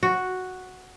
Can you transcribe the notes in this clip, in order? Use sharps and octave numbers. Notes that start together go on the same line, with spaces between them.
F#4